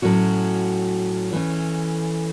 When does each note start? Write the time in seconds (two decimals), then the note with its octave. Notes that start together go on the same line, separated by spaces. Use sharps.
0.02 A2 F#3 C#4 F#4
1.33 E3 A3 C#4